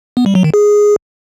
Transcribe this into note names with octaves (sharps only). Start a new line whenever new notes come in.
B3
G3
F#3
D#3
G#4